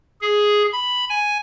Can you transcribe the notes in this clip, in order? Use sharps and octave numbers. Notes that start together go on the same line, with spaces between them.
G#4
B5
G#5